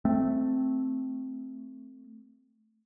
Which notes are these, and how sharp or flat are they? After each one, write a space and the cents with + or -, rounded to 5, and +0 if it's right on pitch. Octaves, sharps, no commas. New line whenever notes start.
A3 +0 C4 +0